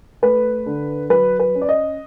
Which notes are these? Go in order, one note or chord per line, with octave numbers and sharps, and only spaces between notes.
A3 B4
D3
F#3 B4
B4
C#4
D5
D#5